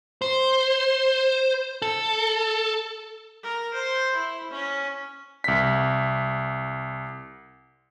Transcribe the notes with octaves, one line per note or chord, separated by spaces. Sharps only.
C5
A4
A#4
C5
E4
C#4
C2 B6